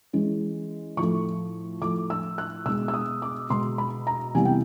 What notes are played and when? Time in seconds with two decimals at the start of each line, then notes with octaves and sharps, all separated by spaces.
0.13 E3 G#3 C#4
0.97 A2 F3 A3 C#6
1.81 A2 F3 A3 D6
2.10 E6
2.38 F#6
2.66 B2 G#3 B3 E6
2.88 E6
2.94 D#6
3.22 D6
3.50 B2 G#3 B3 C6
3.78 B5
4.07 A#5
4.35 C3 E3 G3 B3 G#5
4.45 G5